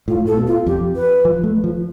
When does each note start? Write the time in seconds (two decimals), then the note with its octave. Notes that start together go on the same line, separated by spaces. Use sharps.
0.08 A2 F4
0.26 A2 A4
0.37 B2
0.47 F4
0.66 F2 G4
0.96 B4
1.25 F3
1.44 A3
1.64 F3